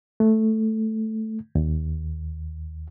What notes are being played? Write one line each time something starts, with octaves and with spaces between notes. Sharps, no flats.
A3
D#2